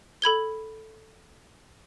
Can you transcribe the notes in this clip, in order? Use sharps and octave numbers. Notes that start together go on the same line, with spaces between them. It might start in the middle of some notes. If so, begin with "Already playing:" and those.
A4 B5 G#6 G7